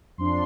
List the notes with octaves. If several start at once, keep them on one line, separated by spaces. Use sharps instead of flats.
F2 F3 D4 C6